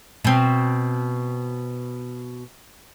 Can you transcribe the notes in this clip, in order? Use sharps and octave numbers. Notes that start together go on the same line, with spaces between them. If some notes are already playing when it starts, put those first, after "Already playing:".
B2 C4